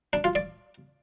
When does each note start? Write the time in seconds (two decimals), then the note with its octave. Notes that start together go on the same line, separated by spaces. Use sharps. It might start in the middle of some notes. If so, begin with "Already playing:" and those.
0.13 D4
0.24 F4
0.35 D5